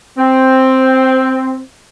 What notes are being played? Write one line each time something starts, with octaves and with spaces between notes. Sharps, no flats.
C4